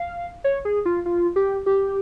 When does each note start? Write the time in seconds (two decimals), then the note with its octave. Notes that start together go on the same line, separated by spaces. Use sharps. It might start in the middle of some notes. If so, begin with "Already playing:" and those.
Already playing: F5
0.44 C#5
0.65 G#4
0.85 F4
1.06 F4
1.36 G4
1.66 G4